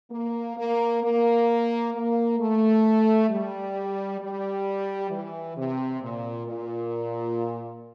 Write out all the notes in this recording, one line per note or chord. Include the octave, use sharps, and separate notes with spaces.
A#3
A#3
A#3
A#3
A3
G3
G3
E3
C3
A#2
A#2